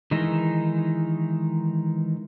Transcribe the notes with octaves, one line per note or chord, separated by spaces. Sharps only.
D#3 E3 G#3 D#4